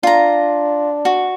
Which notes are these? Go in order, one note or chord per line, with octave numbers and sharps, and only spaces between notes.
D4 F4 A#5
F#4